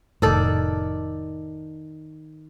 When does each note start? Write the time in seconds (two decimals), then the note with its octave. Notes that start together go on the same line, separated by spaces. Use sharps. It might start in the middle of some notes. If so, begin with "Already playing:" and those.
0.22 F1 A2 D#3 A4 D5